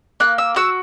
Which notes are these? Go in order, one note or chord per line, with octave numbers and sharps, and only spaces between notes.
A#3 F#6
E6
F#4 E6